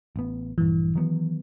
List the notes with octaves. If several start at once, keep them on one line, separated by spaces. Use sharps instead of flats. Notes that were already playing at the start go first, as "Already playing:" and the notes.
A1 B3
A#1 G2 E3
D#3 F#3 B3